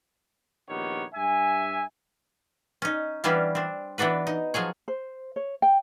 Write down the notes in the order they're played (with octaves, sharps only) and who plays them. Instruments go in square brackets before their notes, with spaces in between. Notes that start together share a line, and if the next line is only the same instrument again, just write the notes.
[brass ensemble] A#1 D#3 B3 G4 C#5
G2 E5 G#5
[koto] C#4 D#4
E3 G3 B3 C#4 D4 F5
C4 D4
E3 B3 D4 F#4 B4
D#4
F3 F#3 G#4 C#5
[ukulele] C5
C#5
G5